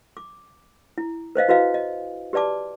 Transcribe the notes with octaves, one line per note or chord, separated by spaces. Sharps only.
D6
E4
B4 C5 D#5 F5
E4 F#4 B4 D#5 F5
D#5
G4 B4 D5 A5 D6